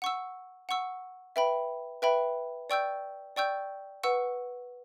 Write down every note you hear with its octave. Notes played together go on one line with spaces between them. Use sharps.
F#5 C#6 E6
F#5 C#6 E6
B4 E5 G5 B5
B4 E5 G5 B5
D5 G5 C#6 E6 G6
D5 G5 C#6 E6 G6
B4 F#5 C#6 E6